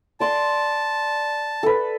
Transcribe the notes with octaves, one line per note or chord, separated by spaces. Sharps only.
D5 A5 C6
A4 B4